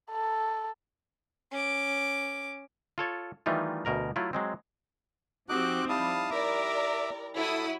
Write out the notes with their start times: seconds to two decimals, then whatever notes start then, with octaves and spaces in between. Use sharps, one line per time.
0.11 A4
1.50 C#4 D6
2.98 F4 A4 C#5
3.46 D#3 E3 G3 A3 D#4 F4
3.85 D2 B2 A#4 A#5
4.16 F#3 A3 E4 F4
4.33 F#3 G#3 C4
5.49 F3 C4 D#4 F#4 G4 D6 F#6
5.89 G3 E4 F5 A5 D#6
6.30 A#4 D5 E5 D6
7.36 F#3 E4 A4 D#6